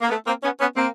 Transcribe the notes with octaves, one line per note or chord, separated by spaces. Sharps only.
A#3
A3 B3
A#3 C4
B3 C#4
B3 C#4
A#3 C4